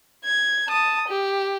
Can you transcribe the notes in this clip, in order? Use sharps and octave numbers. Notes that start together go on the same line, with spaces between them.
G#6
A5 D#6
G4